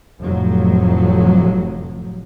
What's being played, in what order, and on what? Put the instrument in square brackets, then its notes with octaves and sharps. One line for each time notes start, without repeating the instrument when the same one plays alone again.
[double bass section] F1 A2 F3 F#3